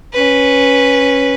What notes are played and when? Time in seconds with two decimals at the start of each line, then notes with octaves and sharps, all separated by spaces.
0.13 C#4 B4